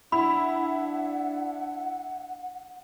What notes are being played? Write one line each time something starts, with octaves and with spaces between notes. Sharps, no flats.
D4 E4 F#5 B5